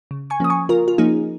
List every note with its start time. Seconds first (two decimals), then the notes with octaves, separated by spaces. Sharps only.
0.11 C#3
0.30 G#5 C#6
0.40 F3 A#3 C#4 D#6
0.50 G#5 C#6
0.69 C#3 F4 A#4
0.88 F4
0.98 F3 A#3 C#4 D#4 G#4